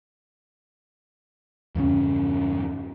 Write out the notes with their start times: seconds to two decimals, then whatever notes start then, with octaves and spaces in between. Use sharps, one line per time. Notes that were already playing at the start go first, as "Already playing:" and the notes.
1.75 E2 G2 C#3 C#4